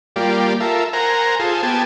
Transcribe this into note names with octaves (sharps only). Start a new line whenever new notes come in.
G3 A#3 F4 G4 D5
F4 A4 A#4 E5
A#4 C5 F#5 G#5 A#5
F4 G#4 A4 C5
B3 G4 G#5 A5